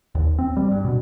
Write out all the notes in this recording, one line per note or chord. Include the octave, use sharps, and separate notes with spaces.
D#2
C4
G3
G2
B2